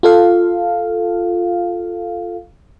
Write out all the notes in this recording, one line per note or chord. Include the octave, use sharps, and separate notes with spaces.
F4 A4 F5